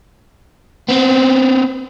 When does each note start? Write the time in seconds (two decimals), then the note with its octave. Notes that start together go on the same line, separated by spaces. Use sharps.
0.89 B3 C4